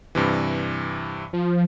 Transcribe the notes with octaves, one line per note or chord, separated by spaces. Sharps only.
G2 C3 E3
F3